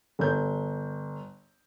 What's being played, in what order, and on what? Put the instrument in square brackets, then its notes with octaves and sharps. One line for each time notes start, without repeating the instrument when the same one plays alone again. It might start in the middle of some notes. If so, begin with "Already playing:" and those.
[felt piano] G1 G6